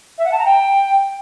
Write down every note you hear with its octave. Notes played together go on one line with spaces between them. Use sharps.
E5
F#5
A5
A#5
G5